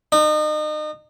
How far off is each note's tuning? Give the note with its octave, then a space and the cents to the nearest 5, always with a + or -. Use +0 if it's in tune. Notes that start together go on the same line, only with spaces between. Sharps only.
D#4 -35